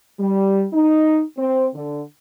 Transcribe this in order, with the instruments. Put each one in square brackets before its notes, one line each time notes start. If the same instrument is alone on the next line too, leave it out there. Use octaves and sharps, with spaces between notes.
[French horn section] G3
D#4
C4
D3